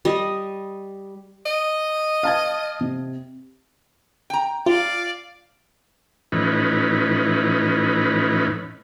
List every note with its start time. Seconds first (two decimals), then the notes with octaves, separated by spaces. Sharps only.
0.05 G3 D#5
1.46 D#5
2.23 F5 A5 G#6
2.81 C3
4.30 G5 A#5
4.66 F4 D5 F5
6.32 A2 E3 F3 C#4 D#4 B4